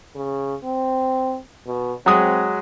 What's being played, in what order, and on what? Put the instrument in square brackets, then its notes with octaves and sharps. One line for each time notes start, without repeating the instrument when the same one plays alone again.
[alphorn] C#3
C4
B2
[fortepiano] F#3 G#3 D#6 [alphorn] C4